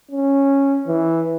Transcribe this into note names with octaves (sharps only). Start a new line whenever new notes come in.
C#4
E3